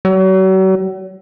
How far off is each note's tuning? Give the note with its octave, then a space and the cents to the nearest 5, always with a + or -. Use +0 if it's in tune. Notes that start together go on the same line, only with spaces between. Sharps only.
F#3 +40